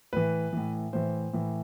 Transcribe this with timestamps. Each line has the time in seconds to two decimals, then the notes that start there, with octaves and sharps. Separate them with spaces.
0.13 A2 E3 B4
0.53 A2 E3
0.93 A2 E3 C5
1.33 A2 E3